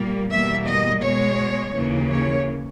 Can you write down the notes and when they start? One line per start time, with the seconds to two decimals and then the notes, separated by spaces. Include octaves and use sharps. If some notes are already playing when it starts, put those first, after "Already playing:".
Already playing: A#2 G3 A#3
0.29 E2 B2 G3 A#3 E5
0.65 D#5
1.01 B2 G#3 C#5
1.74 D#2 C#3 E3 A#3
2.10 C#5